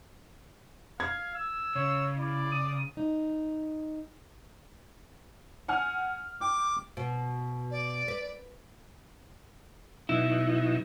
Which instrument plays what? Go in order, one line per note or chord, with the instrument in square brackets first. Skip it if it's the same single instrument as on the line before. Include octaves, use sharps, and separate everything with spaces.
[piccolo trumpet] F5 [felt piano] G#6
[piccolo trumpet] E6
[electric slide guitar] C#3 [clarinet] C#5
[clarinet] E4 [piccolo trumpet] D5
[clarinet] D#6
[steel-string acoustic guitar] D#4
[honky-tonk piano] F#5 G#5 F6
[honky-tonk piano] G5 [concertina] D6
[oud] B2
[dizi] D5
[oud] B4
[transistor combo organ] B2 F#3 D#4 [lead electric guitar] E4